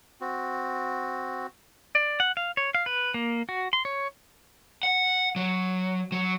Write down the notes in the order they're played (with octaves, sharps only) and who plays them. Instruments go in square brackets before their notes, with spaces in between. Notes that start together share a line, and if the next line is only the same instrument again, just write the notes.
[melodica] C4 F#4
[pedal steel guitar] D5
F#5
F5
C#5
F5
B4
A#3
F#4
C6
C#5
[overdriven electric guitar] F#5
F#3
F#3